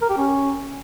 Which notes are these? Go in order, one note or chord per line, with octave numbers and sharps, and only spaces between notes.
A#4
G4
C#4